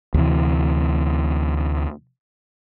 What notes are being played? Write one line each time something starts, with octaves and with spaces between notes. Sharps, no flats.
D2 C3 E3